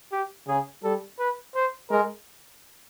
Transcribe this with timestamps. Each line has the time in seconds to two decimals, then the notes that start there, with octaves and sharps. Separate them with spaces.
0.12 G4
0.47 C#3 G#4
0.83 G3 A4
1.19 B4
1.55 C5
1.90 G#3 A#4